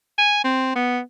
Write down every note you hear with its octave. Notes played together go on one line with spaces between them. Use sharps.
G#5
C4
B3